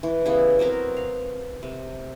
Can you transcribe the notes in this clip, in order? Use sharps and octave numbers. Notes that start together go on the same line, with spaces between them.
E3
C#3 G3 B3 E4
F#3 B3 C4 A#4
F5
C3